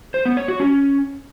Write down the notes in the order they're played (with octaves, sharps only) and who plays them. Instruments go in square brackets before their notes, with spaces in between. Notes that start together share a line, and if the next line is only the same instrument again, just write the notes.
[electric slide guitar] C5
B3
C#5
F#4
C#4